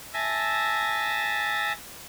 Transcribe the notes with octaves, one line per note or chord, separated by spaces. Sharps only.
E5 G#5 A5 A#6